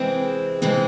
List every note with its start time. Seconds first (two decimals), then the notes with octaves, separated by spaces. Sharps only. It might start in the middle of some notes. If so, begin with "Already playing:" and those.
Already playing: C3 E3 G#3 C4 G#4
0.62 C3 E3 G#3 C4 G#4